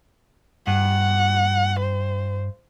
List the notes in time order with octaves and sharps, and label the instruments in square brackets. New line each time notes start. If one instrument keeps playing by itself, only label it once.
[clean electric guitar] G2 [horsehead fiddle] F#5
[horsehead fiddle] C5